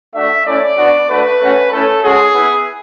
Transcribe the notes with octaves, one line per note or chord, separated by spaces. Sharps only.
A3 D4 F#4 E5
A3 C#4 E4 D5
B3 D4 F#4
A3 D4 F#4 B4
A3 C#4 F#4
A3 C#4 E4 A4
G#3 C#4 F#4 G#4
B3 E4